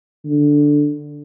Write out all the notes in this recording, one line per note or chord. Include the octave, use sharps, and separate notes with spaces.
D3